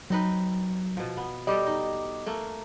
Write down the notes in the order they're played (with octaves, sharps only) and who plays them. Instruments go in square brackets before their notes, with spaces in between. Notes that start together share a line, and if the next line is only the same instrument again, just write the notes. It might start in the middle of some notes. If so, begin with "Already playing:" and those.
[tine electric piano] F#3 [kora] C4 D#4 B4
[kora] B2 F3
B3
[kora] G3 G4 A4 [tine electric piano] D#5 D6
[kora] D#4
A3 A#3